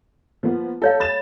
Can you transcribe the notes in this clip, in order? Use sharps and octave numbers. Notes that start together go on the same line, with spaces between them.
F3 A#3 B3
F4 A4 C#5 F5
B5 A6 E7